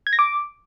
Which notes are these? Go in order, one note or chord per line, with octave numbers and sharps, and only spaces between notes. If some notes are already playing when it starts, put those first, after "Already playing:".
G#6
A#6
D6